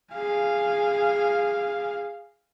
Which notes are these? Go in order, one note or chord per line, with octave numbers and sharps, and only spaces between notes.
G#4 F5